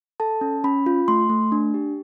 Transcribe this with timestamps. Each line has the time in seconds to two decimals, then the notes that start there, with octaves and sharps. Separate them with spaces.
0.20 A4 A5
0.41 C#4
0.64 C#4 B5
0.86 F4
1.08 A3 C6
1.30 A3
1.52 D4
1.74 G4